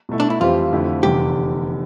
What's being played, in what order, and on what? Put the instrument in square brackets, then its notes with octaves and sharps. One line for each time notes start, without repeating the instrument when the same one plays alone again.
[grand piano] B2 A3 E4
[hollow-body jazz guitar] D4
E4
[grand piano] F2 E3 G3 C4 G4 [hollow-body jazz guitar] F4
[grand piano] F2 D3 A3 E4 G4
[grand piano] F1 E2 D3 [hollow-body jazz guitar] G4